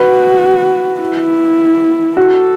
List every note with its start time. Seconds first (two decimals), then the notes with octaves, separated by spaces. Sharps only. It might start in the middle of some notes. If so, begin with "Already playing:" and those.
Already playing: F#4 B4
1.00 E4
2.17 F#4 A4